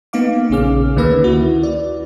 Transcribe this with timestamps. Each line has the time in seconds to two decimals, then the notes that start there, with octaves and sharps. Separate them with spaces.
0.13 A#3 B3 D#4 F5 D6
0.50 A#1 C#3 C#4 G#4 D6 F6
0.96 D2 D#3 A#3 B4 E6 A#6
1.24 E4 F#4
1.63 D5